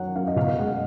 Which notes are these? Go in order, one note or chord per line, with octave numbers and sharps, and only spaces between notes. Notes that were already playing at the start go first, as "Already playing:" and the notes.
Already playing: F#2 D#3 F#3 F#5
F#2 F5
D#5
B2 F5
G#3 F#5